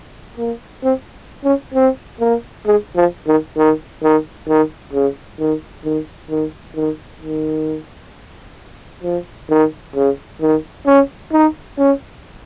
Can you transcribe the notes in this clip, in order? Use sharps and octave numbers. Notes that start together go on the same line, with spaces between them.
A#3
C4
C#4
C4
A#3
G#3
F3
D#3
D#3
D#3
D#3
C#3
D#3
D#3
D#3
D#3
D#3
F3
D#3
C#3
D#3
C#4
D#4
C#4